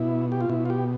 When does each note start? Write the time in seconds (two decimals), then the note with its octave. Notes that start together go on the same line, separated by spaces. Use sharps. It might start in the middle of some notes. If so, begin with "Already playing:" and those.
Already playing: B2 E4
0.32 G4
0.41 F4
0.49 B2 E4
0.65 F4
0.70 G4